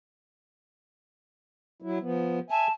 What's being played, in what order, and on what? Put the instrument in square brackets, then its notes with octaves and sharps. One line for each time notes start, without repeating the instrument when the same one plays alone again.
[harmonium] F#3 E4
F3 B3
[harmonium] E5 G#5 [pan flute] A5